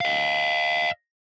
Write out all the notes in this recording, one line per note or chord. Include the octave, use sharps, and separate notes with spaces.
D#5 F5